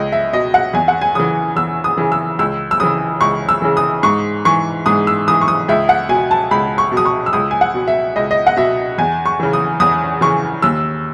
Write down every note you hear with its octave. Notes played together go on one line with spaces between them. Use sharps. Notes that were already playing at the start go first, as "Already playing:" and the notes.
Already playing: C#2 D#5
E5
B2 D#5
F#5
E2 G#5
F#5
G#5
C#3 E3 D#6
E2 E6
D#6
C#3 E3
E6
C#2 E6
E6
C#3 E3 D#6
C#2 C#6
E6
C#3 E3
D#6
G#2 C#6
E3 C#6
G#2 D#6
E6
E3 D#6
C#6
D#6
C#2 E5
F#5
B2 G#5
A5
C#2 B5
C#6
B2
D#6
C#6
E6
C#2 D#6
G#5
F#5
B2
E5
C#2 D#5
D#5
F#5
B2 E5
E2 G#5
C#6
C#3 E3
D#6
E2 D#6
C#3 E3 C#6
D#2 E6